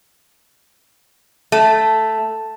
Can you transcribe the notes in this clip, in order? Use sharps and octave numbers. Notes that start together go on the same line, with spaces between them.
A3